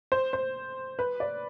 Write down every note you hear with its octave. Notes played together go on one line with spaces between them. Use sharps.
C5
C5
B4
D5